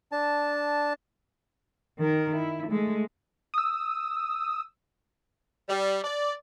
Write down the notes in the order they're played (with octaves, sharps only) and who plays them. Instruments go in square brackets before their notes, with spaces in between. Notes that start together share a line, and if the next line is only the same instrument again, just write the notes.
[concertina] D4 A5
[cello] D#3 A#4
E4
G#3 A3
[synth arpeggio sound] D#6 E6
[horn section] G3
D5